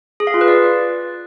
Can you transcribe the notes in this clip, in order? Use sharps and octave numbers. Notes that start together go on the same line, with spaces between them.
G#4
F5
F4
B4
D5